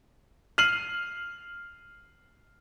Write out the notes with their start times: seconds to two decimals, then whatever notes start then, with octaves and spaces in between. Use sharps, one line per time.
0.58 F6 C7 D#7 F#7